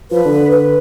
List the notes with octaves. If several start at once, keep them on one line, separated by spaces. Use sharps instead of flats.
F3 B4
D3
B4